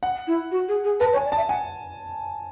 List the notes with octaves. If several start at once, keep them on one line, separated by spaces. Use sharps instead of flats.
F#5
E4
F#4
G#4
G#4
B4 A5
C#5
G#5
D5
E5 A5
F#5 G#5